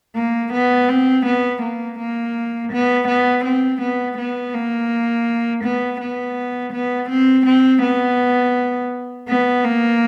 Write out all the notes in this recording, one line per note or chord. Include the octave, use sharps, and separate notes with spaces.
A#3
B3
C4
B3
A#3
A#3
B3
B3
C4
B3
B3
A#3
B3
B3
B3
C4
C4
B3
B3
A#3